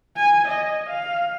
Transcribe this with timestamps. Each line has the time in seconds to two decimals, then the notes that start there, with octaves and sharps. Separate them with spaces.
0.16 G#5
0.47 D#5
0.89 F5